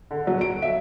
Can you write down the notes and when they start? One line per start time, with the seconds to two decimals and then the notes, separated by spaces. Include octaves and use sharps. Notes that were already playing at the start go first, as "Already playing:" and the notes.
0.11 D3
0.27 F#3
0.41 D7
0.62 E5